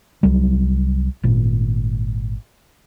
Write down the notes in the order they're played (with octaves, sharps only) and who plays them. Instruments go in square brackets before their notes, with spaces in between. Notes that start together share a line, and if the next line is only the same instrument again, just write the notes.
[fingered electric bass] C2 F#3 G3
G#1 A#2